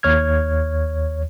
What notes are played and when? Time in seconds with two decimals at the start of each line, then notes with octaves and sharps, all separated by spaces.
0.03 D#2 C#5 F6 G#6